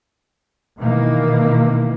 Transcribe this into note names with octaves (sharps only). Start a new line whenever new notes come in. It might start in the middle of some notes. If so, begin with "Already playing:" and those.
B2 D#3 E3 A#3